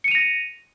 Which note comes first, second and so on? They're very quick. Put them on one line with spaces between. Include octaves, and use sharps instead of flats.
C#7 D#7 F7 A#6